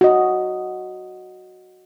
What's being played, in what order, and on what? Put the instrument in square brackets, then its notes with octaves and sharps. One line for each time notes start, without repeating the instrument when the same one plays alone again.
[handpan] F#4 D#5